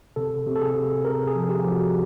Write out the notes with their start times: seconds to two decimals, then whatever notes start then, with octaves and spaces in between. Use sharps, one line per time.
0.16 C3 A4
0.46 C3
0.56 A4
0.61 G#4
0.75 C3
1.05 C3 A#4
1.27 G#4
1.35 F3
1.49 G4
1.64 F3
1.71 F#4